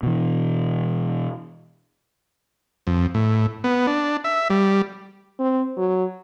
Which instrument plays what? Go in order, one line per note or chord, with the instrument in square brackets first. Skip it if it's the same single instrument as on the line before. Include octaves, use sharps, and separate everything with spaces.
[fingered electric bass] B2 E3
[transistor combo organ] F2
A2
B3
D4
E5
G3
[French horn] C4
F#3